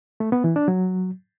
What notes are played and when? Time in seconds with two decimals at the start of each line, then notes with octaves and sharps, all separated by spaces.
0.20 A3
0.32 B3
0.44 E3
0.56 D4
0.68 F#3